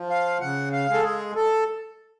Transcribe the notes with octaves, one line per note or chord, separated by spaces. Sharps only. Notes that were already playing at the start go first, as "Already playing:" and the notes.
Already playing: F3
F5
C#3 F#5
F5
G#3 A4
G#4
A4